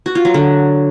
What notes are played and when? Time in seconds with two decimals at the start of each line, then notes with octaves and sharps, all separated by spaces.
0.06 F#4
0.15 F4
0.25 F#3
0.34 D3